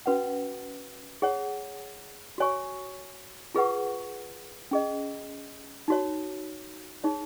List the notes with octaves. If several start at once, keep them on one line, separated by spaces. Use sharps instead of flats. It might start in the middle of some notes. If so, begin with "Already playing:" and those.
C#4 F#4 B4 F#5
G#4 C#5 F#5
F#4 C#5 G#5 C#6
F4 G#4 B4 F#5 C#6
C#4 G#4 D#5
D#4 F#4 C#5
D#4 G#4 C#5